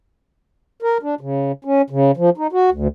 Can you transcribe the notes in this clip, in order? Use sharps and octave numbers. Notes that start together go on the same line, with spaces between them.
A#4
D4
C#3
C#4
C#3
F3
D#4
F#4
D2